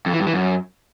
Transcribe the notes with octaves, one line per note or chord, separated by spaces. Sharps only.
F2
E3
G2
E3
F#2